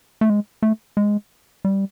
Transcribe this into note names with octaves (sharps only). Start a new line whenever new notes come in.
A3
G#3
A3
G#3
G3